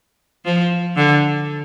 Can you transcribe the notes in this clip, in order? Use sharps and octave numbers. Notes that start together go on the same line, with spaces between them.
F3
D3